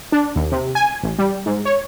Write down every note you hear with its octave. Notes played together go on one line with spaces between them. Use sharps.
D4
D#2
C3
G#5
A1
G3
G#2
C#5